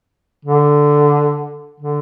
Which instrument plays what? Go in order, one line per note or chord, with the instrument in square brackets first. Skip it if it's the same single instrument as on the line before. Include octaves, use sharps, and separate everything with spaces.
[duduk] D3
D3